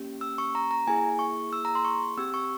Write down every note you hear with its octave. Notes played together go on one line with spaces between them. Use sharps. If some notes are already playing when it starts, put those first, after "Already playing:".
Already playing: A#3 C#4 G4
E6
C#6
A#5
A#5
A#3 E4 G#4 G#5
C#6
E6
A#5
C6
C#6
C4 G4 E6
C#6